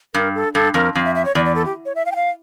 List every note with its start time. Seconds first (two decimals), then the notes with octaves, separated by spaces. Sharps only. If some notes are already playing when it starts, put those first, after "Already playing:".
0.14 G2 A#4
0.35 A4
0.54 G2 A4
0.74 F2 A#4
0.95 F2 F5
1.05 E5
1.15 E5
1.25 C#5
1.35 E2 D5
1.45 D5
1.55 A4
1.65 G4
1.85 C#5
1.95 E5
2.06 F5
2.12 G5
2.16 F5